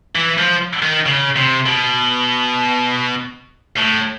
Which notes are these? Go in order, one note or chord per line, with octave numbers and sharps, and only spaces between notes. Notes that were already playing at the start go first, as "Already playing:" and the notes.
E3
F3
D#3
C#3
C3
B2
A2